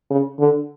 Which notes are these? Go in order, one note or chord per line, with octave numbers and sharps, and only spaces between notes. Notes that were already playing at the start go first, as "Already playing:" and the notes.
C#3
D3